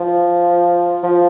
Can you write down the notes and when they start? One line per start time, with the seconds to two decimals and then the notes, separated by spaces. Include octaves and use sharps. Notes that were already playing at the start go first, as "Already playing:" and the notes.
Already playing: F3
1.03 F3